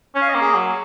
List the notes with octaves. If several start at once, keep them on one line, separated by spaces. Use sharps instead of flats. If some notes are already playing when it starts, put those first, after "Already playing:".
C#4 C#5
F5
D#5
A#3
G#4
F#3